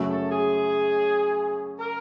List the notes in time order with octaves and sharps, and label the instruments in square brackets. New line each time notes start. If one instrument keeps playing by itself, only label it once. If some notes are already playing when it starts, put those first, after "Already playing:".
Already playing: [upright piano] F#2 C#3 F#3 A3
[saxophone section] A4
G#4
A#4